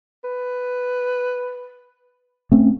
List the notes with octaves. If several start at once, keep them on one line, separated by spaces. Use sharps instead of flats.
B4
A3 C4 C#4